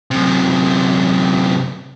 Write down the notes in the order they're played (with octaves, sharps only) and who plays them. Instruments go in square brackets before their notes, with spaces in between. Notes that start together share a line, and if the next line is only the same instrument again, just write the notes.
[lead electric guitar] F#2 C3